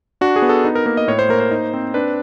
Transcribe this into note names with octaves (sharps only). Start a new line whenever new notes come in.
D4 F#4
G#4
B3
A4
D#4
A#4
A#3 A#4
D#5
A2 C#5
C5
A#3 A#4
C5
D#4
C4
D4 B4